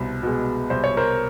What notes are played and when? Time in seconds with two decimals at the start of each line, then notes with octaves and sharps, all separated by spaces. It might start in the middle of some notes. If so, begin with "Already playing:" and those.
Already playing: C2 B2
0.23 B2 G#3
0.70 C2 C5
0.84 C#5
0.97 A#4 C5